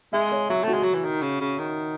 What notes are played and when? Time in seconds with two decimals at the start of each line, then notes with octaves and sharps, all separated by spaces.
0.13 G#3 E5
0.31 C#5
0.50 F#3 E5
0.64 A3 F#4
0.74 G#3
0.83 F#3
0.94 E3
1.04 D#3
1.22 C#3
1.41 C#3
1.59 D#3